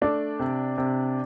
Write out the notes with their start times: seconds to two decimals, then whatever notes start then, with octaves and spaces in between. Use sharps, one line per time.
0.01 A3 D4 D5
0.40 C3
0.78 C3